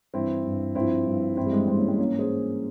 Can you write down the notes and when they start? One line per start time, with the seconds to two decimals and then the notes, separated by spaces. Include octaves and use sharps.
0.14 G2 E3 C4 E4
0.45 G2 E3
0.75 G2 F3 C4 E4
1.06 G2 F3
1.37 G2 E3 C4 E4
1.46 G3
1.52 G#3
1.67 G2 E3 G#3 C4
1.77 A#3 C#4
1.88 G#3 C4
1.98 G#2 E3 A#3 C#4
2.19 G#4 C5